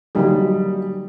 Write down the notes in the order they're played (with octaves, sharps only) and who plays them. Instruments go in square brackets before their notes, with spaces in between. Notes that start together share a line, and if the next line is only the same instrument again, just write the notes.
[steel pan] D3 F#3 A#3 D#4 G#4 [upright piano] G3